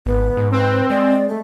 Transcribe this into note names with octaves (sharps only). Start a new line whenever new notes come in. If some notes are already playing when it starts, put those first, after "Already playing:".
G#1 B3
G#2
C4 B4
G#3 D5
A3